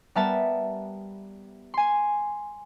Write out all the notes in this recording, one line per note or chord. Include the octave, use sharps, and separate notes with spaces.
G3 B3 A#4 E5 A5
G#5 C6